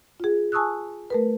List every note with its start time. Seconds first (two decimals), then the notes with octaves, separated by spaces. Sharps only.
0.20 F4 G#4
0.52 G#5 A5 C#6 D#6 E6 F#6
1.10 A3 A#4 B4